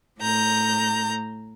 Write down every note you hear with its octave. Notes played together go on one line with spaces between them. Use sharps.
A2 A#5 G6